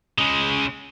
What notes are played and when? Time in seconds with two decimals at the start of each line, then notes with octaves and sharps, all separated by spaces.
0.18 C#3 G#3